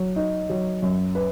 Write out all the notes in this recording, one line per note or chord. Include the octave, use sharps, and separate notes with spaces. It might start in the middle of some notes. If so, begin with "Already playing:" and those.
Already playing: F#3
D#4
F#3
F#2
B4